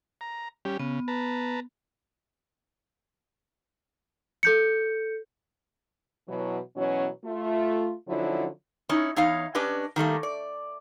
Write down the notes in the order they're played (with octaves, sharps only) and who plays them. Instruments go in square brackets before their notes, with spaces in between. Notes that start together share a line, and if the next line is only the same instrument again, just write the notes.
[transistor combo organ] A#5
G3 C#4 G4
[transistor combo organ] C#3 [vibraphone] B3
[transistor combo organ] B4 A5 A#5
[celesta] A4 G6 C#7
[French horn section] B2 E3 F#3
B2 E3 F#3 C#4
A3 F4
D3 F3 F#3 C#4 D#4 E4
[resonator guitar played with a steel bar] C#4 D#4 E4
E2 D#4 C#5 F5
C#4 D4 G4 B4 D#5
D#3 G3 A3 A#3
D5